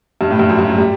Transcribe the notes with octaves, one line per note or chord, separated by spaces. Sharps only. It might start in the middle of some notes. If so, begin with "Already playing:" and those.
G2
A2
G2
F#2
G2
F#3
G3